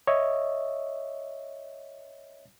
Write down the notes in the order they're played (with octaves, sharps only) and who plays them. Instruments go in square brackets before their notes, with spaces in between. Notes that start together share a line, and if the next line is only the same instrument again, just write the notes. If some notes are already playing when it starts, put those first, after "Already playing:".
[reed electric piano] C#5 D#5 E5